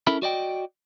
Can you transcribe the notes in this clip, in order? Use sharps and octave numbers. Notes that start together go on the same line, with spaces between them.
C#4 E4 A4 A#4 E5 B5
F#4 D5 D#5 G5